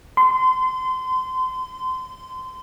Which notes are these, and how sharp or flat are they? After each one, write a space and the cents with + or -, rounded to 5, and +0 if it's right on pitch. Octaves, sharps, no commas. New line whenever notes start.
C6 -30